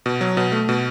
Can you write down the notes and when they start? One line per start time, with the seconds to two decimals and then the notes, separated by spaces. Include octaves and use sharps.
0.06 B2
0.21 F#3
0.37 B2
0.52 A3
0.69 B2